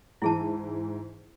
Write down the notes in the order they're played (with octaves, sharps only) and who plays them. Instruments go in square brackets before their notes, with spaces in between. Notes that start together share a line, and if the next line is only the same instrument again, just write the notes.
[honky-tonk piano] G#2 E3 [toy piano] E4 G#4 A5